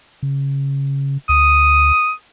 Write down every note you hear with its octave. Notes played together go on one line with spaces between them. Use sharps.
C#3
D2 D#6